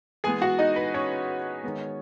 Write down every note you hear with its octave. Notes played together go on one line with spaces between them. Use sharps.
E3 G#3 B3 G#4 G#5
F#4 F#5
D#4 D#5
B4
C#4 C#5
D#3 G#3 B3